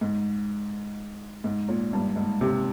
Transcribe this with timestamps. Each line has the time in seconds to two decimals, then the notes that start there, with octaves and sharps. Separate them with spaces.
0.01 G#2
1.44 G#2
1.69 A#2
1.93 G2
2.16 G#2
2.41 C3